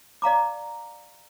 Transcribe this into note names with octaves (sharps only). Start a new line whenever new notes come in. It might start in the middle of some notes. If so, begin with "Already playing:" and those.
D5 F5 A#5 D6